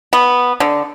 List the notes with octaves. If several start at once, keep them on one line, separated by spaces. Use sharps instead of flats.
B3
D3